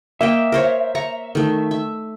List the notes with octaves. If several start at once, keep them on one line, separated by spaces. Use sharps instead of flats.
A#3 D#5 E5 G5
A#4 C5 C#5
A#5 C#6
D#3 A3
E5